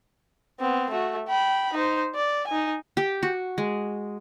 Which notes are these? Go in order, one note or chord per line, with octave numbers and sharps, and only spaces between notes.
B3 C4
A3 F#4
G5 B5
D#4 C5
D5
D#4 G#5
G4
F#4
G#3